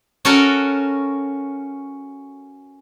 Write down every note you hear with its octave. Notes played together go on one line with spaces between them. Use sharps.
C#4 F#4 A4 A#4 F#5 A5